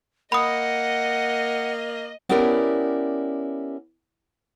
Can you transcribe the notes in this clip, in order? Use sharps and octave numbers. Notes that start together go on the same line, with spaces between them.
A#3 D#5 F#5 B5 D#6
B3 C#4 E4 G4 A#4 D5